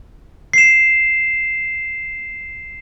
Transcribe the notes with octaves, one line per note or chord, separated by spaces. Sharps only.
C7 E7